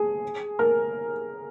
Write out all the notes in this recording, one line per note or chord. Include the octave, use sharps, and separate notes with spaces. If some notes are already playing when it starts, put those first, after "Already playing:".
Already playing: G#4
A#4